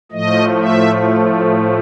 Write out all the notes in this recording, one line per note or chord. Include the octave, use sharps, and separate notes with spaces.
A2 F3 A3 D#5
E5